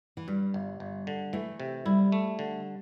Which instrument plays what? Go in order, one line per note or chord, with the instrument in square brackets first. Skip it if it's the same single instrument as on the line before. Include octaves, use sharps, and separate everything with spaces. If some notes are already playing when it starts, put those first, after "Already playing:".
[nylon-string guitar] E3
[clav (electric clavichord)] G2 [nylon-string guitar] G3
[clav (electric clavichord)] G1
G1
D3
[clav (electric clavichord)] E3 [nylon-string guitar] A3
[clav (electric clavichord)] C3
[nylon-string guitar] G3 [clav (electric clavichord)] E4
[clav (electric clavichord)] A3
D3